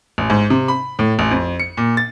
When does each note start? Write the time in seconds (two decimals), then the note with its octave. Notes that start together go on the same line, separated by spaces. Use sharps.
0.18 A1
0.30 G#2
0.50 C3
0.68 B5
0.99 A2
1.19 A1
1.31 F2
1.60 C#7
1.77 A#2
1.97 A6